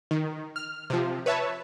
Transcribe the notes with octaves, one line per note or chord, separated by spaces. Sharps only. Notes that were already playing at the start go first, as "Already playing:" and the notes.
D#3
F6
C3 F3
B4 C#5 E5 A5